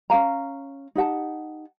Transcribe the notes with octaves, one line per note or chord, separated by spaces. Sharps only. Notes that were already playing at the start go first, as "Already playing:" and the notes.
C#4 G#4 F5 A#5
D#4 G4 F#5 A5